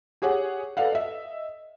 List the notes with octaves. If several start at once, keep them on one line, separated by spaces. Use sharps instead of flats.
G4 G#4 C#5 F#5
A4 B4 D5 F5 F#5
D#5 E5